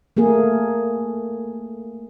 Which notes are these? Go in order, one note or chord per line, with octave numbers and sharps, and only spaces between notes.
A3 A#3 G#4